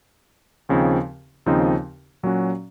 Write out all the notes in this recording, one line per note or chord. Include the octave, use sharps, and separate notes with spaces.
D#2 C#3 F3 C4 D#4
D#2 C#3 F3 C4 D#4
A#2 F#3 C#4 F#4